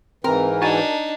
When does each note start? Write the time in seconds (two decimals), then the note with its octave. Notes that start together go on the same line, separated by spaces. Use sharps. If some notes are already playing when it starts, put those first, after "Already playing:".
0.24 G#2 E3 C4 A#4
0.62 D4 D#4 F#4 G#5 A5